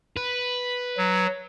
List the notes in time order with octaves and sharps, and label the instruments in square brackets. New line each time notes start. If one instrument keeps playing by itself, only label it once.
[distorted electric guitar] B4
[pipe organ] F#3